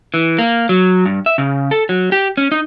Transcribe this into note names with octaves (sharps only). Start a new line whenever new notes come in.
E3
A#3
F#3
G2
E5
C#3
A4
F#3
G4
C#4
D#4